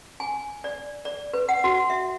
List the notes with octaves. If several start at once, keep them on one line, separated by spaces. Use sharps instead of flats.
G#5
D5
D5
B4
F#5
F#4
E5